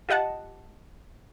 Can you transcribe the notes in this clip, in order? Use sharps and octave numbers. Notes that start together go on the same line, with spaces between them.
F4 G4 D#5 F#5 A5